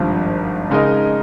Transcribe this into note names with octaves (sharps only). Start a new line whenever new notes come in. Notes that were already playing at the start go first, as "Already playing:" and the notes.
Already playing: G#1 G2 F3
C#3 G#3 D#4 A#4 D#5